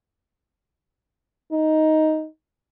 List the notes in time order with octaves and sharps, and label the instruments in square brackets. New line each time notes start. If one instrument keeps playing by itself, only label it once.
[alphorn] D#4